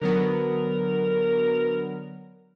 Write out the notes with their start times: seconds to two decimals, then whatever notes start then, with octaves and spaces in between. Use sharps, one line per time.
0.02 D3 F#3 B3 A#4